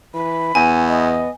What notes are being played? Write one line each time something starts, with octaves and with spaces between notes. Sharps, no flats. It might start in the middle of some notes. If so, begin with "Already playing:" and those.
E3 B5
E2 B3 G#5
D#5